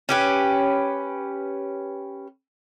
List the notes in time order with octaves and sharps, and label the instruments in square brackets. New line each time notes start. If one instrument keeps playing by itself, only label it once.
[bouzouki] C#4 G4 B4